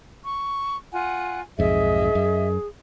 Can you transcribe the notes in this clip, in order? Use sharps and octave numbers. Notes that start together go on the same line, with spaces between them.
C#6
F4 F#5 G#5
B1 F2 G#2 G#4 D#5 E5
F#2